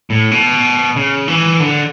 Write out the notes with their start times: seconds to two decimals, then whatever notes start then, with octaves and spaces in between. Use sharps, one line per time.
0.10 A2
0.31 B2
0.96 C#3
1.28 E3
1.60 D3